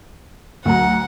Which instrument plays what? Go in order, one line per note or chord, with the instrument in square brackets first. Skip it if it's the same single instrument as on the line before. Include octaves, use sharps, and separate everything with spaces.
[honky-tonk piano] D2 F#3 A#5 [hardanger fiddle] F#5